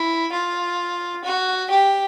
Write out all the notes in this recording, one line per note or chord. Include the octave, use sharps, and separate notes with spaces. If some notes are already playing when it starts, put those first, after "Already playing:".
Already playing: E4
F4
F#4
G4